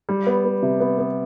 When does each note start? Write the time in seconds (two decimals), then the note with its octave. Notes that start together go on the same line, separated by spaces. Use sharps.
0.09 G3
0.27 B3
0.45 B3
0.62 C3
0.80 B3
0.98 B3